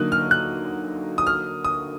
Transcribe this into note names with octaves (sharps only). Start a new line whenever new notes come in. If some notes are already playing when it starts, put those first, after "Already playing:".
Already playing: D3 F#3 A#3 D#4 F#6
F6
F#6
D#6
F6
D#6